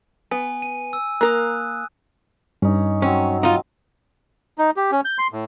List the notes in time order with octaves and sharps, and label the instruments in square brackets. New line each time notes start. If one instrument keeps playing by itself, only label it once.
[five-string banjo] B3 [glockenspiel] G#5
[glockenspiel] D#7
E6
[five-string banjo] A#3 A#4 [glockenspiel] D#6 F#6
[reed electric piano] G2 [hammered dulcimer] C#4 D#4
[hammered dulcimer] F#3 C4 [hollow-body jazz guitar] C#4
[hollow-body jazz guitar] D#4 F4
[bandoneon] D#4
G4
C#4
G6
C6
A2